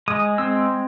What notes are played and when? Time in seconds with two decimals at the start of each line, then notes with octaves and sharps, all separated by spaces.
0.08 G#3 D#6
0.38 C4 E6